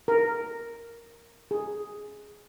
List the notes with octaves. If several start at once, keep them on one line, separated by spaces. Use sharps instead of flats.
A#4
G#4